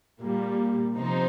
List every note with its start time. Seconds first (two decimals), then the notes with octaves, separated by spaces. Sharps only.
0.21 A#2 G3 A#3
0.94 C3 F3 D#4 C5